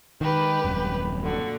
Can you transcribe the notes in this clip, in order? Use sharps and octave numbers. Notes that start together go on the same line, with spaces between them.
D#3 G#3 G4 B4
D#1 F#2
A#2 D3 F#4